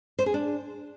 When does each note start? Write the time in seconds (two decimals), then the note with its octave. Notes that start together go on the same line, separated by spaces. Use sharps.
0.19 C5
0.26 G#4
0.34 D4